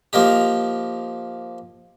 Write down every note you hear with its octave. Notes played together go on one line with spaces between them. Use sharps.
F3 A#3 D#4 G4